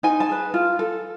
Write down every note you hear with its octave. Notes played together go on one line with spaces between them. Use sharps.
D#4 G#5
A5
G#4 B4
F4
A4